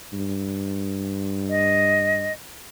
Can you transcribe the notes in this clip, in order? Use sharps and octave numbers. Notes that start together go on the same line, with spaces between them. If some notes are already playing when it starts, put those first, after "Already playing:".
G2
D#5